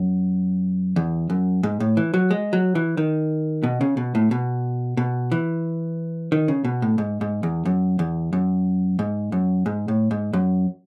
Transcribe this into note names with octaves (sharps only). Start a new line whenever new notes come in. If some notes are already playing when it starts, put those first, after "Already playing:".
Already playing: F#2
E2
F#2
G#2
A2
E3
F#3
G#3
F#3
E3
D#3
B2
C#3
B2
A2
B2
B2
E3
D#3
C#3
B2
A2
G#2
G#2
E2
F#2
E2
F#2
G#2
F#2
G#2
A2
G#2
F#2